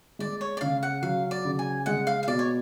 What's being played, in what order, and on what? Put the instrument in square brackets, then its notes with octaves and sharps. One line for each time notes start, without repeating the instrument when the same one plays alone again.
[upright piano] G#3 [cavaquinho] D5
[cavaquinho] C#5
D5
[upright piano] C#3 [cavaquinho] F5
[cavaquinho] F#5
[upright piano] F#3 [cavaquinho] F5
[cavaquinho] D5
[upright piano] C#3
[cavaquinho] G#5
[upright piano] G#3 [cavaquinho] F#5
[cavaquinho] F5
F5
[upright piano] B2 [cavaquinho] D5
[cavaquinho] C#5